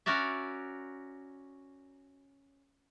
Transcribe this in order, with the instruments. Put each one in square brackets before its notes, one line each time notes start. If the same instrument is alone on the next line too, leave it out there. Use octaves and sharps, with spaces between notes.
[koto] C#4 F#4 A#4 D5 E5